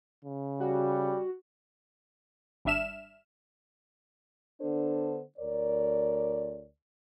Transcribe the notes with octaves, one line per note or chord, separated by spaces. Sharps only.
C#3
G3 F#4
G#1 G3 D4 E5 F6 E7
D3 B3 D4 A4 C5
D2 A#4 C#5 D5